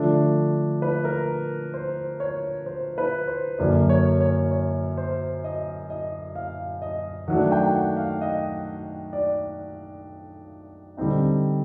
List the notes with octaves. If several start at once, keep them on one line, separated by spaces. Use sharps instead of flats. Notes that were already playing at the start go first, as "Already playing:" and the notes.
Already playing: D3 F3 A3 D4
B4
A#4
C5
C#5
C5
B4
C5
F#2 D3 F#3 A#3 D5
C#5
C#5
C#5
C5
D#5
D#5
F5
D#5
D#3 F#3 A3 D4 F#5
G5
F#5
F5
D#5
D5
D3 G3 C4 D#4